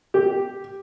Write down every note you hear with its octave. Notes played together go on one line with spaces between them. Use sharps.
G4